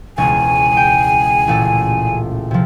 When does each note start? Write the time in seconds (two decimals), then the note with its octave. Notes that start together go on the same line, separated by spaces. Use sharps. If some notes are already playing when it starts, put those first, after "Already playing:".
0.18 E1 C#2 C#5 G#5
0.77 G5
1.48 A1 A#2 A4
2.51 C3 F3